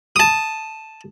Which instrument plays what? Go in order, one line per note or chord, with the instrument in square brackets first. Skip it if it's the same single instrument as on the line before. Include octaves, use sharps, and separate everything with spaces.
[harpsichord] A5 D#6